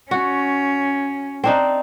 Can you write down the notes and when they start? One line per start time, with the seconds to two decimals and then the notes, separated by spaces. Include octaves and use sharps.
0.11 C#4 F#4
1.44 C4 D4 D#4